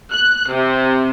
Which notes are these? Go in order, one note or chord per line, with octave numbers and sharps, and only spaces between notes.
F#6
C3